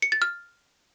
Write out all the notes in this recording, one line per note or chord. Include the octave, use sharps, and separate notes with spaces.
C#7
A6
F6